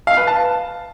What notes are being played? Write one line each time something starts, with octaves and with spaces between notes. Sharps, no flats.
F5
B4
A5